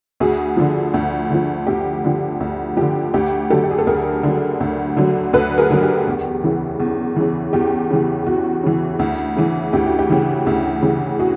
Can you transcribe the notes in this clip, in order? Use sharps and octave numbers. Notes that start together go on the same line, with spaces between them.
D2 F#4 G#4
D3 F3
D2
D3 F3
D2 G4
D3 F3
D2
D3 F3 G4
D2 G4
D3 F#3 G4 A4
G4
G#4
A4
D2 G#4 A#4
D3 F#3
D2
D3 F#3
D2 A4 B4
G#4 A#4
D3 F#3
G4
E2
C#3 E3
E2
C#3 E3
E2 G4
C#3 E3
E2 F#4
C#3 E3
D2
C#3 E3
D2 G4
F#4
G4
C#3 E3
D2
C#3 E3
F#4 G#4